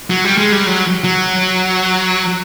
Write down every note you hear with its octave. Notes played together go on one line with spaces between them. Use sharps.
F#3
G3
G#3
G3
F#3
F#3